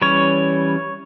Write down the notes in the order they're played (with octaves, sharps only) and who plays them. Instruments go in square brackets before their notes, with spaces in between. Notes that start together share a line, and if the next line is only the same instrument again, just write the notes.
[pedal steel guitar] E3 G3 C#4 C#5